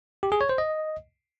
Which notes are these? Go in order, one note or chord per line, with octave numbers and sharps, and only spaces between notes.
G4
G#4
C#5
C5
D#5